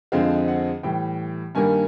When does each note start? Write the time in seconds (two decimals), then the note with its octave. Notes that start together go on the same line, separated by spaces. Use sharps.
0.12 F2 D3 F3 G#3 C4 F5
0.48 F#5
0.83 A2 E3 G3 G5
1.55 G2 D#3 G3 A#3 G#5